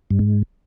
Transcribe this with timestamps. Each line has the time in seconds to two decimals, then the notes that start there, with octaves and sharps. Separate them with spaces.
0.11 G2
0.19 G#2